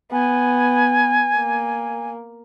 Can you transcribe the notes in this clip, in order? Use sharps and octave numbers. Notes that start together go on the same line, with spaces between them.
B3 G#5
A#3